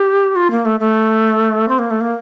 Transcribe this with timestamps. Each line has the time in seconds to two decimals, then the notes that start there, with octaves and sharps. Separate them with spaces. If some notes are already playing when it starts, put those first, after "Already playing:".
Already playing: G4
0.36 F4
0.51 A#3
0.65 A3
0.80 A3
1.69 C4
1.79 A#3
1.91 A3
2.01 A#3